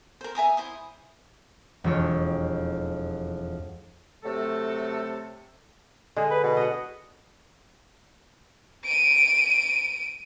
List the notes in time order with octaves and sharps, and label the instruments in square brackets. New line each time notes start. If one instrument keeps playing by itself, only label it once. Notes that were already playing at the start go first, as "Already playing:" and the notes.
[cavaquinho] A#4 C5
E5 G#5 A#5 D#6
E4 C5 D#6
[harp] E1 F2 C#5
[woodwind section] C3 F#3 A3 A4
[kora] D3 G#4 [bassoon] G#3
[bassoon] B4
B2
[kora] D#5 F#5
[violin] D7 D#7